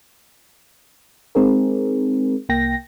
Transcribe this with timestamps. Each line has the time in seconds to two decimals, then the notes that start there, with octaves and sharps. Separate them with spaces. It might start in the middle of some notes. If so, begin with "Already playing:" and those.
1.35 G#3 C4 D#4 G#4 A#4
2.49 C2 A#3 G5 A#6